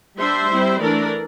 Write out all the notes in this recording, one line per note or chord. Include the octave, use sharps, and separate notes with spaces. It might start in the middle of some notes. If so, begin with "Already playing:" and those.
G3 D4 C5 E5
G3 C4 E4
E3 A3 D4 A#4 D5